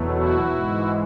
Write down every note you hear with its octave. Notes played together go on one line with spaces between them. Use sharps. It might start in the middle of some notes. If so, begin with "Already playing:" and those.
Already playing: E2 B2 F#3 A3
E4 F#4
G#2 E3 G#3